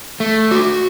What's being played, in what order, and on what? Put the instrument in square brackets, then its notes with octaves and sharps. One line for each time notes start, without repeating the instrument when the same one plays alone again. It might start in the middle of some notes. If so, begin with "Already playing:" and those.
[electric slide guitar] A3
F#4